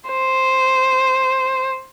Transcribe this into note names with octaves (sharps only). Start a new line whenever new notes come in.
C5